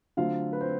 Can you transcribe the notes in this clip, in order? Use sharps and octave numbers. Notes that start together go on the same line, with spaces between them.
D3 F#3 A3 C4 F4 F5
B4
C4 C5